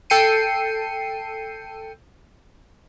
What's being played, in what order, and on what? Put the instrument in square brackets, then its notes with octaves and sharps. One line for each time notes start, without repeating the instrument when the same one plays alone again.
[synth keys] A4 G5 C7 C#7 D#7